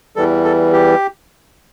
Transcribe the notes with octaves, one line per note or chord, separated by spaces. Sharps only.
E2 E3 G3 A4
A4
G4